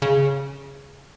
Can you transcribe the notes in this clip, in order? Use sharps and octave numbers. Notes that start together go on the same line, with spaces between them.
C#3